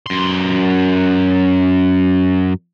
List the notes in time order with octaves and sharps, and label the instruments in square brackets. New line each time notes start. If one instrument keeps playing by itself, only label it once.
[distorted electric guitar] F#2 C6